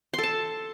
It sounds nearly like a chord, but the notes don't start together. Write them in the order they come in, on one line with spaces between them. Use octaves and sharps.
C6 A4 A5